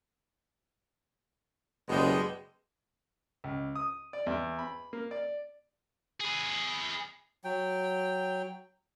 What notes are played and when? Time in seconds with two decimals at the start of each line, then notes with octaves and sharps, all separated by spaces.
1.89 F#1 B2 G3 G#3
3.44 C#2
3.75 D#6
4.13 D5
4.27 E2
4.59 B5
4.93 A#3
5.11 D5
6.20 G#4 B4
7.44 F#3 G5